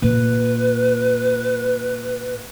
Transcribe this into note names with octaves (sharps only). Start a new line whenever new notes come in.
A#2 B4